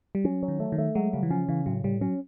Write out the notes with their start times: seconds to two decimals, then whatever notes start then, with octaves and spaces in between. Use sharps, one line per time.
0.15 G3
0.24 F#3 C#4
0.43 F#3
0.48 D#3
0.60 A3
0.72 D#3
0.78 A3
0.95 F#3 G#3
1.13 C#3 G3
1.23 E3
1.30 F3 C#4
1.49 C#3 E3
1.66 A2 F#3
1.84 A2 G3
2.01 F#3 C#4